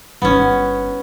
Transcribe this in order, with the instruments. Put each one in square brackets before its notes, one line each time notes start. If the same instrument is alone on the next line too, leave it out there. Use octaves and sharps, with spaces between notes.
[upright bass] G1 D#4 [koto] B3 C#4